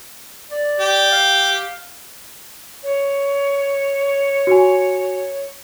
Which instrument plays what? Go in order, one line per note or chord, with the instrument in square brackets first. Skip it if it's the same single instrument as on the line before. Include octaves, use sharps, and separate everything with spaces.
[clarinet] D5
[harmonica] G4
[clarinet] F5
[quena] C#5
[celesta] F#4 G#5